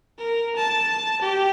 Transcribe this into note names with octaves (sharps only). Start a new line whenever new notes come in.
A#4
A5
G4